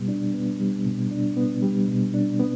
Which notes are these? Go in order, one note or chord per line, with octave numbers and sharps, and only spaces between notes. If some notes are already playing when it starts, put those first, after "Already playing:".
Already playing: B2 G3 B3
D4
B3
G3
B2
D4
B3
G3
B2
D4
B3